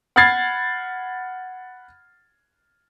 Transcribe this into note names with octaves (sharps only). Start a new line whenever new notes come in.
F#5 B5 F6 G#6 A6 C7